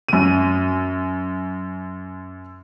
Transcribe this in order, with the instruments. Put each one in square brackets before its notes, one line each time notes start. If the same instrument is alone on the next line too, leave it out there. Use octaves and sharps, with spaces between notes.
[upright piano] F#2 D#7